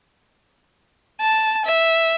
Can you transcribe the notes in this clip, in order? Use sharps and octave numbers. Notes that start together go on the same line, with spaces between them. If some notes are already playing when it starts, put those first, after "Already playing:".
A5
E5